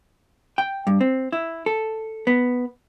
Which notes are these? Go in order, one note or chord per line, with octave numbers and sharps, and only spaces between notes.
G5
G2
C4
E4
A4
B3